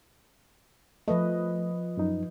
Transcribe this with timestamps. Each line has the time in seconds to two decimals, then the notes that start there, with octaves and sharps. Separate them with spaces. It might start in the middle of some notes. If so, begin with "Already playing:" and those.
1.08 F3 A3 B4 D#5
1.97 F#2 D#4